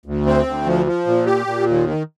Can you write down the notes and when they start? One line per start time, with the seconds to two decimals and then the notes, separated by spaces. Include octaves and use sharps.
0.06 D2
0.26 C4
0.46 D2
0.66 F3
0.86 F3
1.06 A#2
1.26 G4
1.46 A#2
1.67 D#2
1.87 D#3